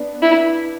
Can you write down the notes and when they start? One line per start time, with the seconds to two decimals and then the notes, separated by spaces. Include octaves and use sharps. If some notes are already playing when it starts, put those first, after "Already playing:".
Already playing: B3 D4
0.22 E4